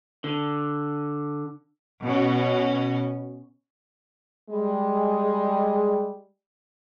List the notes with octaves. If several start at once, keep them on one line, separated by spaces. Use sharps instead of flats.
D3
B2 C#4
G3 G#3